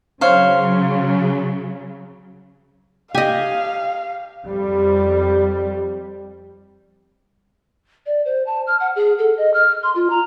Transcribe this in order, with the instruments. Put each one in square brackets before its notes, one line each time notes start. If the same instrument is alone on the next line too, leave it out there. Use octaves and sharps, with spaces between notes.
[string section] C#3 F#3 [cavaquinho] C5 C#5 F5
[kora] G4 [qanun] D#5 G#5 [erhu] F5
[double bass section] F2 G3
[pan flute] D5
C5
A5
F6
F#5
G#4
A4
D#5
F6
C6
F4
A#5